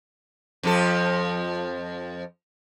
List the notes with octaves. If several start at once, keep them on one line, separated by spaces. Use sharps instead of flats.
F2 F3 A4